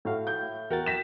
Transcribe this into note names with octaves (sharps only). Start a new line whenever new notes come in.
A2 A3 F#4 F5
G6
E2 F#4 A#4 G5 A6
A#6 B6 E7